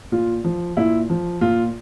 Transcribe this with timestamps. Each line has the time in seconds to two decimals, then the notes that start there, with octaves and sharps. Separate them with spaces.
0.12 A#2 F4
0.44 F3
0.77 A#2 E4
1.10 F3
1.41 A#2 F4